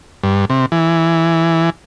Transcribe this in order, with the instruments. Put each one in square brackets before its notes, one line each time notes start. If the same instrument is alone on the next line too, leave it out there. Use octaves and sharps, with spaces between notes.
[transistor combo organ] G2
C3
E3